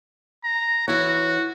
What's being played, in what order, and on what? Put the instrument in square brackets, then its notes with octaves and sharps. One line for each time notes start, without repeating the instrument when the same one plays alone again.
[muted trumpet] A#5
[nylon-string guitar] E3 E4 C#5 [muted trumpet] F#4